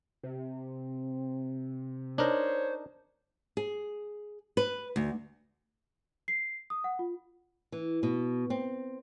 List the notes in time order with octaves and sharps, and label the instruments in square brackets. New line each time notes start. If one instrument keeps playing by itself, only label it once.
[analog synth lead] C3
[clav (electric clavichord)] D4 D#4 A#4 [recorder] C5 [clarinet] C#5
[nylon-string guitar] G#4
B4
D2
[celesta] C7
D#6
F#5
F4
[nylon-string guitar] E3
B2
C4